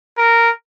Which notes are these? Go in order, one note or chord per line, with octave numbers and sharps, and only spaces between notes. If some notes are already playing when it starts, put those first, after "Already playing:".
A#4